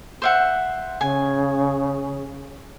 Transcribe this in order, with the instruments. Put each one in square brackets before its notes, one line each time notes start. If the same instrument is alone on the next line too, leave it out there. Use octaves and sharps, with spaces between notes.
[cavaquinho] C5 E5 F#5
[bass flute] C#3 [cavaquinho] G#5